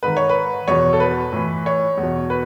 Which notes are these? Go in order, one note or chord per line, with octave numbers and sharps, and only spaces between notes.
G#2 D#3 B4
C#5
B4
E2 B2 C#5
A4
B4
A2 E3
C#5
E2
B2
B4